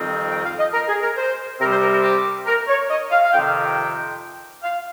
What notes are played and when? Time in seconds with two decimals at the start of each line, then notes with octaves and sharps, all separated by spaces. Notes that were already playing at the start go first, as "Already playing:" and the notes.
Already playing: F2 D#3 G3 C4
0.09 G5
0.30 G5
0.45 F5
0.59 D#5
0.74 A#4
0.88 G#4
1.03 A#4
1.17 C5
1.60 C3 G3 C4 A#4
1.71 C5
1.82 A#4
1.93 A#4
2.03 G4
2.47 A#4
2.68 C#5
2.90 D#5
3.11 F5
3.24 F5
3.33 F2 C3 D#3 G5
3.48 F5
3.62 G5
4.63 F5